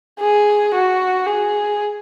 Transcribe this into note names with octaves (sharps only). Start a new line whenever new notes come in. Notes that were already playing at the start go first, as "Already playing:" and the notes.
G#4
F#4
G#4